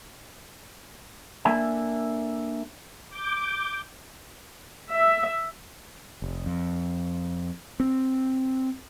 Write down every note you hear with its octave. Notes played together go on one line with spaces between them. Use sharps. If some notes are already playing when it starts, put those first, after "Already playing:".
A#3 D4 A4 E5 G#5
D6 G6
E5
F1
F2
C4